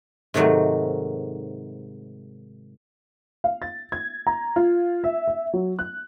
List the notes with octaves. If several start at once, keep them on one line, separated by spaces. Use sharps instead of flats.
G#2 C3 D#3 F#3 A3
F5
A6
G#6
A#5
F4
E5
E5
F#3
F#6